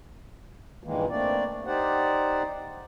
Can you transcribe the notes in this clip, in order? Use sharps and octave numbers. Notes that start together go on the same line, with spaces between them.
G2 A#2 D#3 E3 G#3 A#3
A3 A#3 C4 D4 D5
D#4 G4 C5 D5 F#5